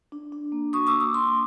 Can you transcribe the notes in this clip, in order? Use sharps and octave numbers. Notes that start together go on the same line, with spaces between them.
D4
D4
A#3
F#4 C#6 D#6
D6 E6
A#3
C#6 D#6
D4 C6 D6